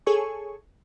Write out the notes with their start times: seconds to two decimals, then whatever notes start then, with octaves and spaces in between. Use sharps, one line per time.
0.07 G#4 A4 C#5 G#5 C#6